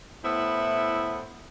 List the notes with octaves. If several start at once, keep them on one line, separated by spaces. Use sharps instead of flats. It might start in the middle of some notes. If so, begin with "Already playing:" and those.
A2 B3 E4 C5 E5